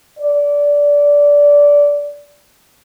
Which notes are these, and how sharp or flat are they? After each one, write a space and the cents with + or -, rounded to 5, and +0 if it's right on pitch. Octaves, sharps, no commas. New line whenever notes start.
D5 -15